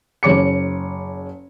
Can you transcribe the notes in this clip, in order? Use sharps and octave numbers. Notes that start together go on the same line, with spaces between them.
F#1 C#5 D6 C#7